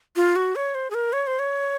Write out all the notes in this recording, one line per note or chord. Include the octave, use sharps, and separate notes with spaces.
F4
F#4
C#5
C5
G#4
A#4
C#5
C5
C#5